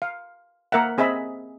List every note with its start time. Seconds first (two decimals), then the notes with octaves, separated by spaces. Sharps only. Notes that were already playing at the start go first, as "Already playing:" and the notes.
0.02 F5
0.72 A#3 A#4 E5 F#5
0.98 C4 G#4 D#5 E5 B5